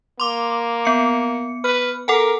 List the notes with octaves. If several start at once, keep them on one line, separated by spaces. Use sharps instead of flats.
A#3 C6 D6
B3 C#7
B4 F6
A4 A#4 F#5 G#5